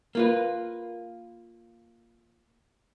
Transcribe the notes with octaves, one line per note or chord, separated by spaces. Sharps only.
A#3 F4 B4